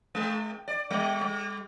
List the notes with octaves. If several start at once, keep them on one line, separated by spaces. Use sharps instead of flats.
G#3
D5
G3
G3